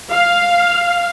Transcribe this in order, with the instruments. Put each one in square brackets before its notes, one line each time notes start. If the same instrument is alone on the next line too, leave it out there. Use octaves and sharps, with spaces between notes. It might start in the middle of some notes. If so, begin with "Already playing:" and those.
[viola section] F5